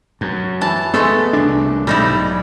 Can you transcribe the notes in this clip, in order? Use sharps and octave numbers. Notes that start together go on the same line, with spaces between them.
F#2
E3 A5
G#3 A3 B3 A4
C2 D4
B1 G#2 G3 D#4 E4